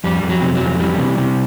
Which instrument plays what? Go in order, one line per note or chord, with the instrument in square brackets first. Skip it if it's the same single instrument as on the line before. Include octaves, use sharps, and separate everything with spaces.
[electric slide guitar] F2 G3
F2
F#3
C3
F#3
F2
E3 G3
C3
C3